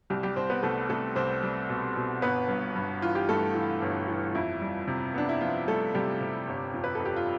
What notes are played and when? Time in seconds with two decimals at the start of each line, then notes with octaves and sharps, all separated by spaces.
0.10 C2 G3 G4
0.23 G3 G4
0.36 C2 C4 C5
0.50 B3 B4
0.63 C2 A3 A4
0.89 C2 A3 A4
1.16 C2 C4 C5
1.43 G3
1.69 B2
1.96 B2
2.22 G1 B3 B4
2.48 G2
2.76 G2
3.02 E3 F4
3.15 G4
3.28 G2 A3 A4
3.55 E3
3.82 G1
4.08 E3
4.35 F2 E4
4.62 G3
4.88 C3
5.14 B3 D4
5.29 E4
5.41 F3 B3 F4
5.68 G3 A3 A4
5.95 C3 G3 G4
6.20 C3
6.47 G1
6.74 F2
6.84 B4
6.95 F2 A4
7.05 G4
7.16 F4